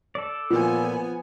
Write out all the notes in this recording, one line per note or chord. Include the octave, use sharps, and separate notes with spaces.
A4 D5
A#2 F3 B3 G#5